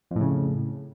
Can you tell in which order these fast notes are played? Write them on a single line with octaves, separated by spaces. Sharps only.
F2 A2 C#3